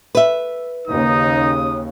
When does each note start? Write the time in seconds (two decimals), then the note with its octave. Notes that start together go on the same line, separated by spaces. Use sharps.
0.15 B4 E5
0.87 D#2 C#3 D#4 D#6